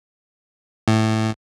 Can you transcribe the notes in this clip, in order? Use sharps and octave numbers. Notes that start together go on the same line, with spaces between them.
A2